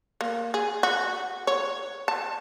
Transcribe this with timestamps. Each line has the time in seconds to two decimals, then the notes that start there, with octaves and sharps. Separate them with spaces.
0.21 A#3
0.54 G#4
0.83 F#4
1.47 C#5
2.08 A5